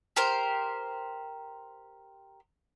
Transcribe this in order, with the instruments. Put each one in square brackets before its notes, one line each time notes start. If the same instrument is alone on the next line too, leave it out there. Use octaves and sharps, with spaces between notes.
[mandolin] G4 A#4 C5